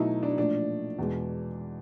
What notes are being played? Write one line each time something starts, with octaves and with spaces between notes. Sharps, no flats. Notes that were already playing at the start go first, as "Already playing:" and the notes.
Already playing: B2 F#3 A3 D#4 E4
D4
A#2 F3 A3 D4
E2 B2 G#3